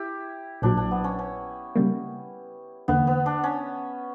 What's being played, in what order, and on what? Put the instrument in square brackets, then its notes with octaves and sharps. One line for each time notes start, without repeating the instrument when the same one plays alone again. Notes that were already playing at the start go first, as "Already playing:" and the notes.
Already playing: [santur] E4 G4
[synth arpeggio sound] A#1 A#2 F#3 [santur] D4
[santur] D4
B3
C#4
C#4
[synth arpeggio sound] C#3 G3 A#3
[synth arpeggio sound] E2 D3 A#3 [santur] B3
[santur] B3
D4
C#4